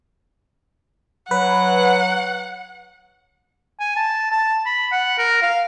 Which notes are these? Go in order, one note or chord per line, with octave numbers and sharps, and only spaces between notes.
F#3 B4 F#5
G#5
A5
A5
B5
F#5
A#4
F5